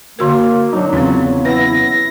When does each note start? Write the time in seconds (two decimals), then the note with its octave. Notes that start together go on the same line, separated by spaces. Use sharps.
0.19 D3 A#3 F#4 A#4
0.73 F#3 D4 D#4
0.93 E2 C#3 B3 C4 F4
1.45 E4 B4 F#5 A#6